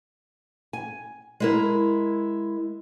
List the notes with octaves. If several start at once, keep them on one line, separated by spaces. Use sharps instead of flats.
G#5
G#3 E4 A#4